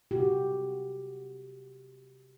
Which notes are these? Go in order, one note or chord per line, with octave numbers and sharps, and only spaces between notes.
C3 F#4 G4